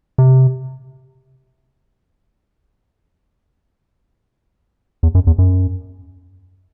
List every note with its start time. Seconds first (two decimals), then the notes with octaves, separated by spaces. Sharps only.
0.18 C3
5.03 E2
5.15 F#2
5.27 E2
5.38 F#2